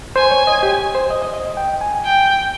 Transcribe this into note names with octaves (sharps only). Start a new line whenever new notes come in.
C5 G#5
C#5
D#5
G4
C5
D#5
D#5
D#5
G5
G#5
G5